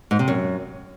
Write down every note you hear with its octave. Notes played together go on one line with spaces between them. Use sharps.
G#2
C3
F#2